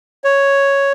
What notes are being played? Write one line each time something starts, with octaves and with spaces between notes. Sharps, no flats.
C#5